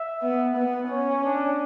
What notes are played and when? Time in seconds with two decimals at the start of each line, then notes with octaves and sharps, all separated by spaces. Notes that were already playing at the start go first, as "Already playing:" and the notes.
Already playing: E5
0.22 B3
0.56 B3
0.90 C#4 C#5
1.24 D4